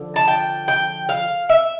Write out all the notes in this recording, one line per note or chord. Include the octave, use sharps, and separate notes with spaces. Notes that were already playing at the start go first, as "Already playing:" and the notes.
Already playing: D3 F3
A5
G5
G5
F5
E5